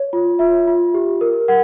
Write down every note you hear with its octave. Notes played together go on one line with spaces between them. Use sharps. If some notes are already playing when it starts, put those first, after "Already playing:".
Already playing: C#5
F4
F4 E5
F4
G4
A#4
A#4 F#5